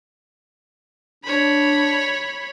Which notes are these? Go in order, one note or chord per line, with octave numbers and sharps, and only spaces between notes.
D4 C#5 B5